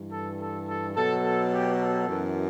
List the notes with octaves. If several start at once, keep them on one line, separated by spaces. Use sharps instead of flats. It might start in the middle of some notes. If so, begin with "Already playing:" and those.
Already playing: G2 E3
A4
A4
A4
B2 F#3 A4
A4
G4
A4
F#2 E3